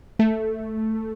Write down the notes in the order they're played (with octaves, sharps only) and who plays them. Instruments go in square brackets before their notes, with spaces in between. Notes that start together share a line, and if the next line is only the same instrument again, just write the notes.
[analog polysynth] A3